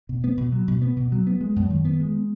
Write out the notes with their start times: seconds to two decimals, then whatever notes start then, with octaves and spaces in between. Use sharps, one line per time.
0.09 B2
0.24 B3
0.37 B2
0.52 F#3
0.68 B2
0.82 B3
0.96 B2
1.12 F#3
1.27 B3
1.41 G#3
1.56 F#2
1.70 D#3
1.85 B3
2.00 G#3